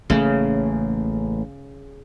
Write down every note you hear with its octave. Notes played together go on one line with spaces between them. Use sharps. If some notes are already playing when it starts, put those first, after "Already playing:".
A1 C#3 A3 A#3